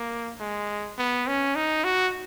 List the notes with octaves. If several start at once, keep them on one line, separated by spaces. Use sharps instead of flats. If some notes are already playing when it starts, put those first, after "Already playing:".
Already playing: A#3
G#3
B3
C#4
D#4
F#4